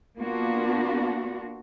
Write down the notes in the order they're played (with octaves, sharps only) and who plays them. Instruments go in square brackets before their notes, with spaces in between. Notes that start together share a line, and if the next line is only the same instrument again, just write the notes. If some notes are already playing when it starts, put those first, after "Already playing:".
[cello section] A#3 B3 D4 F4 F#4